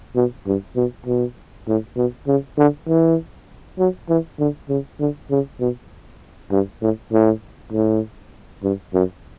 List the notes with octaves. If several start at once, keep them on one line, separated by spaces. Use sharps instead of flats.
B2
G2
B2
B2
A2
B2
C#3
D3
E3
F#3
E3
D3
C#3
D3
C#3
B2
G2
A2
A2
A2
G2
F#2